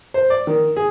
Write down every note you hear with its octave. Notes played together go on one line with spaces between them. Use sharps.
C5
D5
D#3
G#4